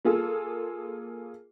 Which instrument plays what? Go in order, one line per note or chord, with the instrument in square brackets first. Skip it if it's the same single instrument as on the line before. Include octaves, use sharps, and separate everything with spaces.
[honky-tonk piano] A#3 F4 G#4 A4